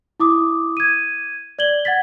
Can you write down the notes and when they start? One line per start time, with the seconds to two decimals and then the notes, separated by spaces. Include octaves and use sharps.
0.20 E4 D6 D#6
0.77 G#6 D#7
1.59 D5 G#6 F#7 G7
1.85 F#5 G#6 A6 B6